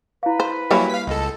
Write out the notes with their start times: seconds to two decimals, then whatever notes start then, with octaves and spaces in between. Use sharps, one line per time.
0.23 E4 B4 F5
0.40 C5
0.71 F#3 G3 A#3 E4 C#5 G#5 B5
0.90 F5 B6
1.07 C#2 A4 D#5